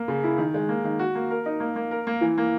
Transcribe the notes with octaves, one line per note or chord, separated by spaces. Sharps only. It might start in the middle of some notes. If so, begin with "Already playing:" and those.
Already playing: A#3
C#3
E4
D#3
G#3
A#3
D#3
F#4
A#3
A#4
D#4
A#3
A#3
A#4
A#3
E3
A#3